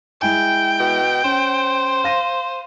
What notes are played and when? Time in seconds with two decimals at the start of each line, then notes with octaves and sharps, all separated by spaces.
0.22 G#3 E4 G5 G#5
0.80 B2
1.24 C#4 C5
2.04 F5 A#6 D#7